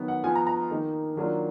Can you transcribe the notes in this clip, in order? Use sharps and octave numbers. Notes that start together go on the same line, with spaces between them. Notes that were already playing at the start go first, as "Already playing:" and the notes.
Already playing: D#3 F#3 B3
F#5
F3 B3 F4 G#5
A#5
A#5
D#3 A#3 D#4
D#3 F#3 A#3 D4 F4